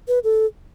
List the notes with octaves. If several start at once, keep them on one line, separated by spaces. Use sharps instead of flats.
B4
A4